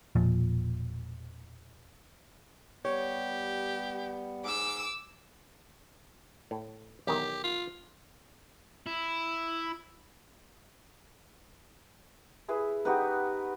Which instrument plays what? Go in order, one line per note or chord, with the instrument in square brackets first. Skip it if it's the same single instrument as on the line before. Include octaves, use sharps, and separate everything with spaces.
[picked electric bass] E1 A#2 F3
[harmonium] G3 B3 [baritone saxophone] G4 [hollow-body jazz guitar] C#5
[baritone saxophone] G#2 [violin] D6 E6
[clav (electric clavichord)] A2
[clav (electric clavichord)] B1 E2 D#3 [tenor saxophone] G4
[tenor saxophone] F4
[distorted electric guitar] E4
[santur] E4 G#4 B4
[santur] B3 D#4 G4 [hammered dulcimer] F#4 B4